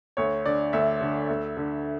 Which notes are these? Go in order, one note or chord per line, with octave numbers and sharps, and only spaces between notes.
D2 C#5
D3 D5
D2 E5
D3
D2
D3